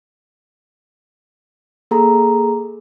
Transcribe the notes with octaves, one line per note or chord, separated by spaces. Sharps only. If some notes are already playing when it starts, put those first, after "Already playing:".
A#3 G#4 A4 A#5